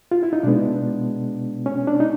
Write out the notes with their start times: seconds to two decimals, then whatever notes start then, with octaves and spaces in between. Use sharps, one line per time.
0.11 F4
0.23 E4
0.33 D#4
0.43 B2 G#3 B3 D4
1.66 C#4
1.87 D4
2.00 D#4